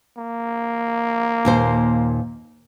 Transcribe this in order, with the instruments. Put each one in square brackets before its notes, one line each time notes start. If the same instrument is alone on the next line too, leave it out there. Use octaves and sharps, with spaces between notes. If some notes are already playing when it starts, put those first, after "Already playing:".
[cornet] A#3
[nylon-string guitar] D#2 A#2 C5